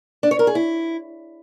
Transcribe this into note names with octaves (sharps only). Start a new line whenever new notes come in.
D4
C#5
A#4
G#4
E4